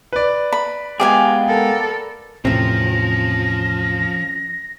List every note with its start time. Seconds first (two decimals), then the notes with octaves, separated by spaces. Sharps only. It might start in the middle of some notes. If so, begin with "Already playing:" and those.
0.13 B4 D5
0.53 B5
1.00 G#3 B3 G4 G#4 F5 G#5
1.48 A4 A#4
2.45 E2 A2 C3 F3 C4 C#4 A#6